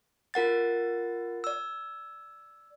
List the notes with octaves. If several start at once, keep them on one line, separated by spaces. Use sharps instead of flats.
F4 A#4 F#5 A6
D5 E6